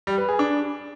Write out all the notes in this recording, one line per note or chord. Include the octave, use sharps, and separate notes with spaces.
G3
B4
G#4
D4